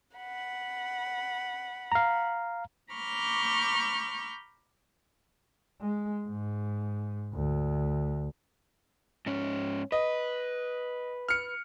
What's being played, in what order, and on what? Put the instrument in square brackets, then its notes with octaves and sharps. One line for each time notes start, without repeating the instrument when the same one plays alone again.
[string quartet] F#5 B5
[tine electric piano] F5 A#5
[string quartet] A#5 B5 C#6 D6 F6 G6
[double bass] G#3
G#2
D2
[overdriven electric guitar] G#2 C#4
[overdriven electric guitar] B4 [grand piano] D#5
[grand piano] F6 C#7